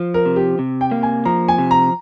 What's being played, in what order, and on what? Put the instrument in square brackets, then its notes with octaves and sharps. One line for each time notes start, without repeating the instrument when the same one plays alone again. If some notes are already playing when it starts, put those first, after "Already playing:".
Already playing: [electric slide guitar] F3
[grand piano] A#4
[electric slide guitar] C3
[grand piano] G4
[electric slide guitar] C3
[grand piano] G5
[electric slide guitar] A#3
[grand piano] G#5
[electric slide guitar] F3 [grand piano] A#5
[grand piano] G#5
[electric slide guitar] C3
[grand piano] A#5